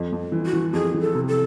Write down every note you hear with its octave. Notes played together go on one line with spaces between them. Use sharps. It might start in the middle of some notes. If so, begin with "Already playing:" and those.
Already playing: F2
F2
E3
F#4
E3
F2 G#4
E3
A4
C3
A4